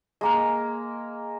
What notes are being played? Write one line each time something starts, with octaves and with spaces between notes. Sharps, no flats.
G#3 A#3 A#4